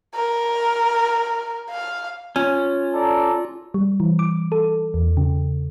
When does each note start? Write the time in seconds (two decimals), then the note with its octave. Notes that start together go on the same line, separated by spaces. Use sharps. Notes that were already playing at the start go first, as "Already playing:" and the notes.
0.15 A#4
1.70 F5
2.36 C#4 F4
2.93 A4 D5 A#5
3.74 G3
4.00 E3
4.19 D6
4.52 A4
4.94 E2
5.17 C#3